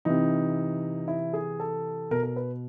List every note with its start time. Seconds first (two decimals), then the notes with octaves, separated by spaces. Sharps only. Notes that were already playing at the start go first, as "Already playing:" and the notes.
0.05 C3 E3 D#4
1.08 E4
1.34 G#4
1.60 A4
2.11 B2 A#4
2.23 A#4
2.36 B4